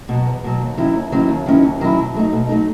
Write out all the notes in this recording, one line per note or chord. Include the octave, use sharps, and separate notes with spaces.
B2 F#3
E2
B2 F#3
D#2
D#3 F#3 C#4 E4
D#2
D#3 F#3 C#4 E4
D#2
D#3 F#3 C#4 E4
D#2
D#3 F#3 C#4 E4
B2
F#3 A3 D#4
B2
F#3 A3 D#4